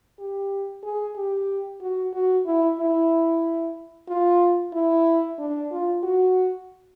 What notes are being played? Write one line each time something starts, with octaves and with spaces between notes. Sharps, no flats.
G4
G#4
G4
F#4
F#4
E4
E4
F4
E4
D4
F4
F#4